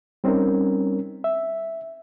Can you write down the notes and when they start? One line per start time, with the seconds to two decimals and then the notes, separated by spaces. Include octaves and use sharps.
0.24 G3 C4 C#4 D#4 A#4
1.24 E5